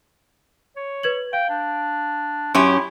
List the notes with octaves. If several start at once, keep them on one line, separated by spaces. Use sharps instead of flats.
C#5
B4 G#6 F#7
F5 G5
D4
F#2 C#4 E4 G4 C6